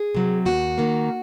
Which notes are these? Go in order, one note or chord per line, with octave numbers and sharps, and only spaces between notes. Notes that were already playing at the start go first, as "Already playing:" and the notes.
Already playing: G#4
C3 F#3
D#2 F#4
D#3 A#3